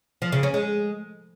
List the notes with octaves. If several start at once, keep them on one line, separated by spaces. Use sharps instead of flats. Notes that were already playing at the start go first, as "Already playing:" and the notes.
F3
C#3
C#4
G#3